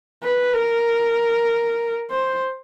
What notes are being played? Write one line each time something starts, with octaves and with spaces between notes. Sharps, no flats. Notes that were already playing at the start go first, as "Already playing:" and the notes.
B4
A#4
C5